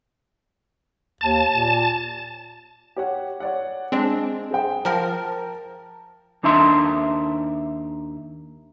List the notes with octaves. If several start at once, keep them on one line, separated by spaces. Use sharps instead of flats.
D#2 A5
A#2
G4 C#5 F#5
C#5 D5 F#5
G#3 C4 D4
G#4 C5 G5
F3 A#4 G5 A5 A#5
D#2 D4 D#4 E5 C6